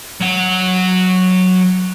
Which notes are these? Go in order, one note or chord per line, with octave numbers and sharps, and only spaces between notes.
F#3 F#5